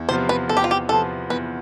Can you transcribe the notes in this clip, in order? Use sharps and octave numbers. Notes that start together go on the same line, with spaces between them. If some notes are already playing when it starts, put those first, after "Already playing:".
Already playing: E2
C3 F3 B3 F4 C5
B4
E2 A4
G4
F4
G4
C3 F3 B3 F4 A4
E2 B4